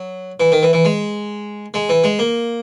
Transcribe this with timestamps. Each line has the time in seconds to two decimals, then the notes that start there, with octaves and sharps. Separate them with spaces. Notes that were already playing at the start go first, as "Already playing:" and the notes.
Already playing: F#3
0.40 E3
0.52 D#3
0.63 E3
0.73 E3
0.85 G#3
1.74 G#3
1.89 E3
2.04 G#3
2.19 A#3